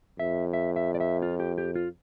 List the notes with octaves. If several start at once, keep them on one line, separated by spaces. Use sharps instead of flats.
F2 E5
E5
E5
D5
E5
F4
G4
G4
F4